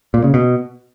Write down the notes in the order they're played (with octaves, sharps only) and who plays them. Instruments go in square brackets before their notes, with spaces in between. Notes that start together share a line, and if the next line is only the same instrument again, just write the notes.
[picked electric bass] A#2
C#3
B2